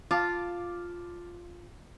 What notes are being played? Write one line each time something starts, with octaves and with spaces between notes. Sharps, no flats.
F4 F5 A5 D6